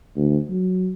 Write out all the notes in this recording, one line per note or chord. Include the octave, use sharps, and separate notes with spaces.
D2
F#3